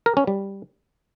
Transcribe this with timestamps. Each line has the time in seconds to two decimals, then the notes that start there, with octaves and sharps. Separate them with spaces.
0.06 A#4
0.17 C#4
0.27 G3